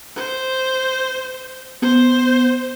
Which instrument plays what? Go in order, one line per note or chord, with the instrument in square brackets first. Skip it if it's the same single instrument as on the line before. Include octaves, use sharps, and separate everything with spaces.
[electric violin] C5
[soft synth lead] B3 [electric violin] C5